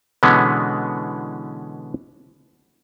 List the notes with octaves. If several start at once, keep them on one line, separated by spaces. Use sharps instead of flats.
B2 D3 E3 G#3 B3 C#4